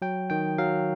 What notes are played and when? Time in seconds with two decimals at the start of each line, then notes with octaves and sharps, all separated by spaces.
0.02 F#3 G5
0.30 D#3 G5
0.58 F#3 F5